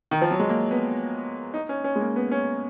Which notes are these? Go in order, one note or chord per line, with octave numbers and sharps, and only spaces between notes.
D#3
F3
F#3
G#3
A#3
B3
D#4
C#4
C#4
G#3
A#3
B3
C#4